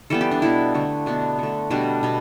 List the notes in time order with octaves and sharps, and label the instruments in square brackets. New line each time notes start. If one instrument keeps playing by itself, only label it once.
[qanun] E3 G3 B3 A4
G4
D4
B2 B3 E4
D3 A3
B2 B3 D4
D3 A3
B2 G3 B3 D4
B2 B3